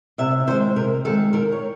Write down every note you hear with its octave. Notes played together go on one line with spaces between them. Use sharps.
C3 E5
D#3 G#3 C5
C3 A#4
D#3 G#3 A4
D#3 A#4
C#5